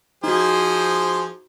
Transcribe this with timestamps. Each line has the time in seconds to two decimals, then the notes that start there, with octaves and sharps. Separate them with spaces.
0.24 F3 D#4 F#4 G#4 C5